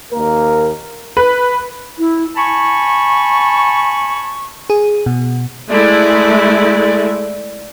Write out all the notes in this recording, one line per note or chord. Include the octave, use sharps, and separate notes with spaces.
D#2 A#3 A#4
B4
E4
G#5 A5 B5 C#6
G#4
B2
G#3 A3 E4 D5